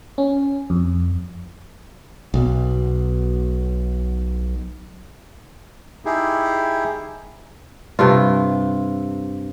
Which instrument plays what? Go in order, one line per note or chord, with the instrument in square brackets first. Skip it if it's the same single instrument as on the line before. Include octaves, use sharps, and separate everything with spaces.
[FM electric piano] C#4
F2
[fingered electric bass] B1 B2
[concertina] D#4 E4 G4 G#4
[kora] G2 C3 F4